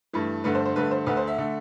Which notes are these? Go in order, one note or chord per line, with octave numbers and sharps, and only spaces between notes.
G2 E3 A3
G2 D3 A3 B4
C5
C5
G2 D3 A3 B4
C5
D2 D3 A3 B4
C5
E5
D3 A3